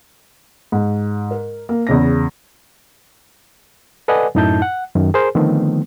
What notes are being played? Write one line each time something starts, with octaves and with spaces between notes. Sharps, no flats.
G#2
A#4
A#3
E2 C#3 A#6
A4 B4 D5 D#5 F#5 G#5
F#2 A2 D#4 E4 A5 G6
F#5
F#2 D#3
G#4 A#4 C5
D3 D#3 F3 A3 B3 C4